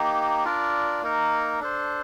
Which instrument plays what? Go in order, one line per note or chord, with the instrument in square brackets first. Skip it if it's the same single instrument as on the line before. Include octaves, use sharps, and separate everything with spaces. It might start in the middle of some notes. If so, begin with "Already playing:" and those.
Already playing: [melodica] A#3 D#4 G4
D4 F4 A#4 D5
A#3 D#4 A#4
D4 A4 C5